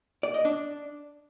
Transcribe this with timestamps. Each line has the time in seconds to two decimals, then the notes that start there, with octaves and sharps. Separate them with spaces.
0.23 D5
0.34 D#5
0.45 D4